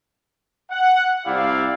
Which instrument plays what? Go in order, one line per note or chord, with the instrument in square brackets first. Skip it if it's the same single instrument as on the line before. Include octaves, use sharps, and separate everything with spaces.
[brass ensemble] F#5
C2 E4 G4 D5 F5